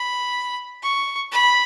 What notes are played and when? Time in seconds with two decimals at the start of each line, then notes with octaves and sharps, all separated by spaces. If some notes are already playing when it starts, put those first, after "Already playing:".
Already playing: B5
0.83 C#6
1.32 B5